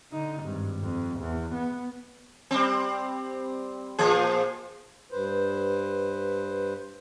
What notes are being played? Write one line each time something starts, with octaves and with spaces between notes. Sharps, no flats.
D3 D#4
G#1 G2
F2
E2
B3
G3 C4
A#2 F3 G#4
G2 B4 C5